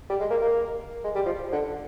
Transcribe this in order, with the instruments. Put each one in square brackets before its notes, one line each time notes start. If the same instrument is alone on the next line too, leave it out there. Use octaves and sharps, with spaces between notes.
[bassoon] G3
G#3
A#3
A#3
G#3
G3
F3
D3